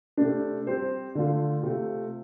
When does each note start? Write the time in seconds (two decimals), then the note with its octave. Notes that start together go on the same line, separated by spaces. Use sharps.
0.17 C3 A3 D4
0.67 G3 C4 G4 C5
1.15 D3 A3 F4
1.63 C3 A3 F4